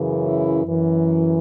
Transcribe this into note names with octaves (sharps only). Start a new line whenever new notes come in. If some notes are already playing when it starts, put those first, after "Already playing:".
Already playing: F#2 C#3 E3
E4
F#2 E3